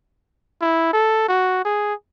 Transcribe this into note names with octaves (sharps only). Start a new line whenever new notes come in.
E4
A4
F#4
G#4